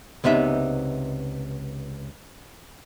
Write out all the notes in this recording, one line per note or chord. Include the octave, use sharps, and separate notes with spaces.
C#2 C3 B3 D#4 E5